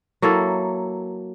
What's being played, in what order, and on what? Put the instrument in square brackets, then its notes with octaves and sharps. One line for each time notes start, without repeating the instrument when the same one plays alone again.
[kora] F#3 A#3 E4 A4